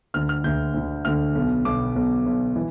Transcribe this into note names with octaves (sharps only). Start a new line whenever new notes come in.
D2 D3 F6
F6
D2 D3 G6
D2 D3
D2 D3 F6
B1 B2
B1 B2 D6
B1 B2
B1 B2
E3